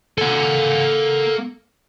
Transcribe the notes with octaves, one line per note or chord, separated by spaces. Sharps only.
A#3 A4 F#5 G#5